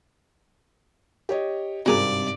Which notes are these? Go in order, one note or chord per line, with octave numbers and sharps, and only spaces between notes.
G4 C#5 D#5
G#1 G2 C3 F#4 G#4 A#4 D5